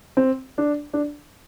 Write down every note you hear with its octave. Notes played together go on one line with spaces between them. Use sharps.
C4
D4
D4